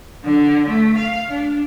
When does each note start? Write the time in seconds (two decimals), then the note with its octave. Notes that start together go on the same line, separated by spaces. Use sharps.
0.24 D3
0.68 A3
0.97 F5
1.30 D4